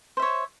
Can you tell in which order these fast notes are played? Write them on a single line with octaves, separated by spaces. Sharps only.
C5 E5 C#5